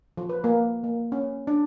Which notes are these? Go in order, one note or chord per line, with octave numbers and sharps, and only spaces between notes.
F3
B4
A#3
A#3
C#4
D4